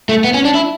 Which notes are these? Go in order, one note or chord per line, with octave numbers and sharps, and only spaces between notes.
A3
B3
C#4
D4
E4